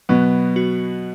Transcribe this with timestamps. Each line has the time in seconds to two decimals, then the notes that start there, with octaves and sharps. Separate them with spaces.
0.09 B2 F#3 B3
0.56 F#4